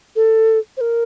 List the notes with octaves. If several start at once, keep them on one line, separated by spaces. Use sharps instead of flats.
A4
C5
A#4